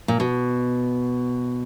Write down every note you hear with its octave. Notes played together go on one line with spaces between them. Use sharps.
A#2
B2